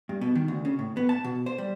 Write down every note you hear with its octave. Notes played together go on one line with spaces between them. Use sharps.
G2
B2
D#3
D2
C#3
A2
B3
A5
B2
C5
G3